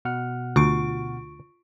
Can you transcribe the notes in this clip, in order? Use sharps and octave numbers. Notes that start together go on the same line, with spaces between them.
B2 F#5 F6
D2 F4 C#6 D7